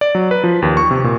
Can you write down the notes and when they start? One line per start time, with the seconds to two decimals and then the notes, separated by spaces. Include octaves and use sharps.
0.01 D5
0.15 F#3
0.31 B4
0.44 F3
0.62 D#2
0.77 C#6
0.91 C3
1.04 A#2